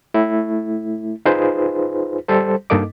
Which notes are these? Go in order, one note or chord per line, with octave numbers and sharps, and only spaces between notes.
A3 E4
D#4 F4 G#4 B4 C5
G3 A4 C5
G2 A#3 D#4 A4 D#5 D6